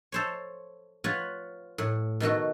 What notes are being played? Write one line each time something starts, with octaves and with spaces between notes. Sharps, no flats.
A4 C5 C#5
F4 B4 C#5 F#5
A2
B2 D#3 A3 F#4